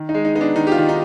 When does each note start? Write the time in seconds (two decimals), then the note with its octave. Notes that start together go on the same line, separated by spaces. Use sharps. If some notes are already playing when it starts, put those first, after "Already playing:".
Already playing: D#3
0.09 D#4
0.14 G#3
0.25 D#4
0.35 B3 D#4
0.41 D4
0.56 D#3 D#4
0.67 G4
0.72 F4
0.77 D#3
0.89 D#4